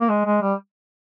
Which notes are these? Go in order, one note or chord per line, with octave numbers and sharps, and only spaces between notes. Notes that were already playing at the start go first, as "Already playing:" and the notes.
A#3
G#3
G#3
G3